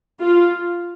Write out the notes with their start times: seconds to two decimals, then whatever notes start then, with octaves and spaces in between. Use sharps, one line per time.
0.21 F4